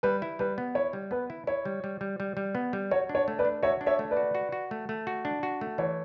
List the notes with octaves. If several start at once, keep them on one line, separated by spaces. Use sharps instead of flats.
G3 B4
E4
G3 B4
B3
E4 C#5
G3
B3 B4
E4
E4 C#5
G3
G3
G3
G3
G3
B3
G3
F#4 C#5
D4
C#5
A3
B4 D5
D4
F#4 C#5 E5
D4
C#5 E5
A3
B4 D5
F#4
F#4
F#4
A3
A3
F#4
D4
F#4
A3
E3 C#5